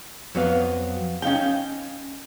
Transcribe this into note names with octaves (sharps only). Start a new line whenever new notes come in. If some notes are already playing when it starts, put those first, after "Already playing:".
F2 F#3 B3 F5
C#4 D#4 F5 G5